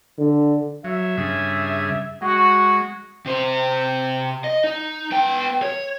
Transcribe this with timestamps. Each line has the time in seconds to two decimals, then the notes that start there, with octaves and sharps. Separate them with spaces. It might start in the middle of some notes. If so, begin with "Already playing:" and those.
0.18 D3
0.84 F#3 E5
1.18 G2 C#3 G#4
2.22 G#3 F#4
3.26 C3 C5
4.44 D#5
4.64 D#4
5.12 B3 G5
5.62 C#5